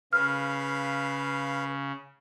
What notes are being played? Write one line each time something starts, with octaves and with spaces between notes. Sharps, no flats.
C#3 B4 F5 F6